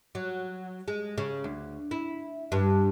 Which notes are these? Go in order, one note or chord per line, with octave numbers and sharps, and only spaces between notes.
F#3
G#3
C#3
D2
E4
G2